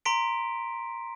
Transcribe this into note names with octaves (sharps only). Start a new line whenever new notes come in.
A#5 C6 B6 D7